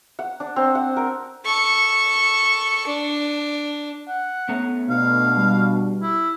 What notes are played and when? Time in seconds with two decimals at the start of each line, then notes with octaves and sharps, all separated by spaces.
0.19 F#5
0.40 D4
0.56 C4
0.75 F#5
0.96 A#4
1.45 A4 C#6
2.86 D4
4.08 F#5
4.49 A3 B3 C#4 A#5
4.90 B2 D4 F5
5.36 G3
6.02 E4